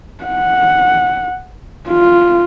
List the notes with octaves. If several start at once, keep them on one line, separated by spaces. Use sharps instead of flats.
F#5
F4